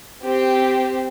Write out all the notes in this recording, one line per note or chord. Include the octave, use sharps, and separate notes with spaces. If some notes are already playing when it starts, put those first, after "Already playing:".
C4 G4